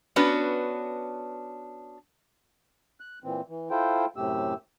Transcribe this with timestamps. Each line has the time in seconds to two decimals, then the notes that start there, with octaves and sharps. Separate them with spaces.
0.16 B3 C#4 D4 F#4 B4
3.00 F#6
3.24 A#2 E3 C4
3.48 E3
3.71 E4 F4 A4 C5 G5
4.16 F#2 A2 C3 A3 G4 E6